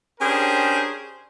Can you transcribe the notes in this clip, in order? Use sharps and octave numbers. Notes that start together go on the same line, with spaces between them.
C#4 D4 G4 G#4 A#4 C5